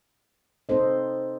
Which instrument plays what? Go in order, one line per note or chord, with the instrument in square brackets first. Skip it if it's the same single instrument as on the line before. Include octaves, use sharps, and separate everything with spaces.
[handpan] C4 D#4 A4 C5 D#5